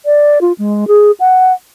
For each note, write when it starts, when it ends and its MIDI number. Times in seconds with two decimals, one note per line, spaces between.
0.05 0.39 74
0.41 0.52 65
0.58 0.88 56
0.88 1.11 68
1.20 1.53 78